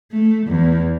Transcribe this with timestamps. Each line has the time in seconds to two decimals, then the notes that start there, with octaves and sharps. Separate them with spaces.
0.12 A3
0.47 E2